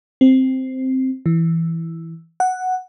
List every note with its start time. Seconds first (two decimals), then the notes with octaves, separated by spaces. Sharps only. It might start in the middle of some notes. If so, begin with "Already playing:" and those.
0.21 C4
1.26 E3
2.40 F#5